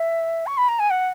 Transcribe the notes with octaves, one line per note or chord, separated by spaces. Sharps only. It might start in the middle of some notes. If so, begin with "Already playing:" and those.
Already playing: E5
C#6
B5
A#5
G#5
F#5